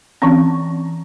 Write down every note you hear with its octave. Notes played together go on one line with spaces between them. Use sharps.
E3 C4 C#4